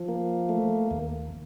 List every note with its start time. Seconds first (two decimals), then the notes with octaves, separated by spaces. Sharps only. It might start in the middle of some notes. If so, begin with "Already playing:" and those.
Already playing: F3
0.08 A#3
0.49 A3
0.91 D#2